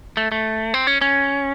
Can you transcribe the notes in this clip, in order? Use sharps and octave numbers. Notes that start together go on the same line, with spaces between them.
A3
A3
C4
C#4
C#4